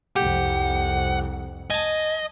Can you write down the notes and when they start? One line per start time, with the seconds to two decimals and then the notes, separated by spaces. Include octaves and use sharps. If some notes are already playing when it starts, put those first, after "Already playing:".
0.16 C2 F2 G4 F#5
1.70 D#5 G#5 A5